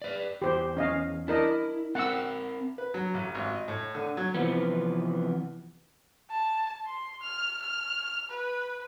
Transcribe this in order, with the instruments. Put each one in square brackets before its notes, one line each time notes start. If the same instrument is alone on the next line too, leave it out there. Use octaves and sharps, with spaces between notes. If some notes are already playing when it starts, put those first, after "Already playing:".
[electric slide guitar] B4 D5
[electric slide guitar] E2 [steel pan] G4 C5
[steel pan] C#4 D#5 F5
[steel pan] D4 A#4 D#5 [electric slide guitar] E4
[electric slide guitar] C4 A#4 G5 [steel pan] F#5 E6
[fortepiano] B4
F#3
A1
G#1
D#5
A2
D3
F#3
[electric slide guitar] C3 E3 F3 B3
[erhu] A5
C6
F6
F6
B4